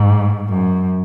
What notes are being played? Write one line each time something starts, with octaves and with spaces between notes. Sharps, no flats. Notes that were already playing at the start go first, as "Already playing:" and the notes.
Already playing: G#2
F#2